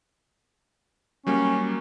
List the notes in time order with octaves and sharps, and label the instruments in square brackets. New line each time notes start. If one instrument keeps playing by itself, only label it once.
[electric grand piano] F#3 G3 A#3 [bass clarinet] C#4